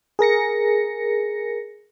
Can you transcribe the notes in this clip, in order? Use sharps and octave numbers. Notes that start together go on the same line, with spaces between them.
G#4 A#4 A#6 C#7